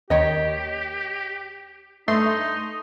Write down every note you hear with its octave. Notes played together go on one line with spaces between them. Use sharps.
D#2 D#3 G4 C#5 D#5
G2 A3 D#4 C6